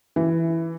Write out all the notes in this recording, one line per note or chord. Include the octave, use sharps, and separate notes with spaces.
E3